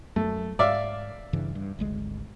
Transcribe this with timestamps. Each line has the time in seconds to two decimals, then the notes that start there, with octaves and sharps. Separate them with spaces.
0.16 F#2 A3
0.59 G#2 D5 E5 F5
1.33 G2 C#3 E3
1.55 G2
1.79 G#1 D2 G#3